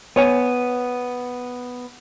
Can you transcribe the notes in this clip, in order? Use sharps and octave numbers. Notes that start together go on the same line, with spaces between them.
B3 C#5 G#5